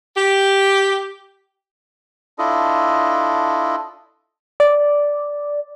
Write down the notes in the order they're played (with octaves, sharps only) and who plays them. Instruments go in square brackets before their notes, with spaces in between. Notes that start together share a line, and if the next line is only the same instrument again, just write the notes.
[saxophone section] G4
[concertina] D4 E4 F4 A4 D#5
[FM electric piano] D5